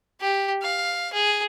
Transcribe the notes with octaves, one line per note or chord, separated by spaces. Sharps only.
G4
F5
G#4